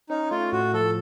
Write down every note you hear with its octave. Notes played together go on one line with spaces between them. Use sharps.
C#4 D#4
A3 F4
A2 F#4
F3 A4